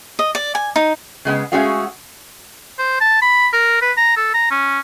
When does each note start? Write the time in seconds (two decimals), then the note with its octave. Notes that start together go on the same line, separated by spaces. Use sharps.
0.19 D#5
0.35 D5
0.55 G#5
0.76 D#4
1.25 C#3 G#3 B3
1.52 G#3 A3 C#4 F#4 G#4 F5
2.78 C5
3.01 A5
3.22 B5
3.53 A#4
3.82 B4
3.97 A#5
4.17 A4
4.34 A#5
4.51 C#4